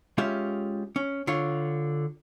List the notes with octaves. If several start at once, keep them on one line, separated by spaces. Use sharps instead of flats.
G#3 C#4 F4 G4 E5
C#4
D3 F4 C#5